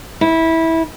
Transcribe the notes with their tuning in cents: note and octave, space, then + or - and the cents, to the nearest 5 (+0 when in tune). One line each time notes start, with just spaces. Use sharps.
E4 -15